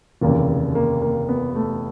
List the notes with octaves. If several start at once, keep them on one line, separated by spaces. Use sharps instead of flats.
F1 D#2 C#3 E3 A#3
A#3
A#3
B3
A3